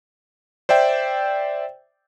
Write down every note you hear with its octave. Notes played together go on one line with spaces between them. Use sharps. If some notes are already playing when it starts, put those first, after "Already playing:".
C5 D5 E5 G5